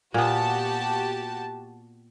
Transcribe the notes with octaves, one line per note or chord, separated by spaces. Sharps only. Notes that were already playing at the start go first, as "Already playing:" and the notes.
A#2 B3 F#4 G4 A5